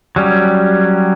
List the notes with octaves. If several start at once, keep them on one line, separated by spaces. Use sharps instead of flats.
F#3 G3 C#4